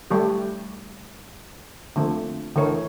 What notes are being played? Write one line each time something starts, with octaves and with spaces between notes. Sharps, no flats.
G3 A3 G4
D3 F3 A3 A#3 C4
D3 E3 A3 A#4 C#5